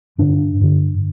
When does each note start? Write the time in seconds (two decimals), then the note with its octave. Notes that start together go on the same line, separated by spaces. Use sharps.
0.18 G2 D3 D4
0.61 G2 D3